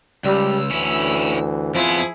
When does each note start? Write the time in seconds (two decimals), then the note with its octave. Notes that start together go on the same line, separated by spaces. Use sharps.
0.24 C#2 G3 E6
0.71 D2 E3 C#4 E4
1.75 F2 F3 B3 E4 G#4